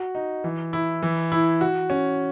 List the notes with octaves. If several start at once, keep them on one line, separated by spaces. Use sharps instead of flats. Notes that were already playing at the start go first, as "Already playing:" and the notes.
Already playing: F#4
D#4
E3
E4
E3
E4
F#4
C#4